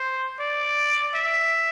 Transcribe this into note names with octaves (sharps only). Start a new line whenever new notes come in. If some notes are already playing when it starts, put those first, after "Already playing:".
Already playing: C5
D5
E5